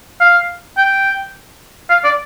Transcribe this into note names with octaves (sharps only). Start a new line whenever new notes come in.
F5
G5
F5
D5